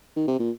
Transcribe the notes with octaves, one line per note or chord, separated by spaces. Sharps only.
D#3
C3
A#2